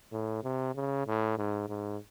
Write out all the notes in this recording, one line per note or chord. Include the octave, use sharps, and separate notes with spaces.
A2
C3
C#3
A2
G#2
G#2